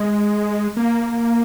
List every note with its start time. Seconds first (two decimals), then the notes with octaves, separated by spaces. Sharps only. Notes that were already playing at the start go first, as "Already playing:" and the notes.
Already playing: G#3
0.77 A#3